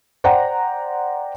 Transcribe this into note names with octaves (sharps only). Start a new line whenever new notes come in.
C5 D5 F#5 G5 A#5